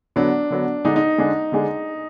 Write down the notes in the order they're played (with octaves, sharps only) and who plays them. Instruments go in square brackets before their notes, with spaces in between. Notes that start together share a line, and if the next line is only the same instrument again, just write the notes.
[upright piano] D3 F#3 B3 [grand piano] D4
[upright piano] D3 F#3 B3
[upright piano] D3 G#3 D4 G#4 [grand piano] D#4
[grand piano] D#4
[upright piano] D3 G#3 D4 G#4
D3 G#3 D4 G#4